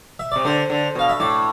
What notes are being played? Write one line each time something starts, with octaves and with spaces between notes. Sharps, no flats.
E5
C3 D5
D3 C5
D3
B2 F5
E5
A2 D5